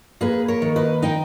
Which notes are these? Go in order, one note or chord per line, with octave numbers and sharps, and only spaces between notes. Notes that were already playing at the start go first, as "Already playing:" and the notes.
A#3 G#4 B4
A#4 C#5
D#3
B4 D#5
D#4 D#5 G5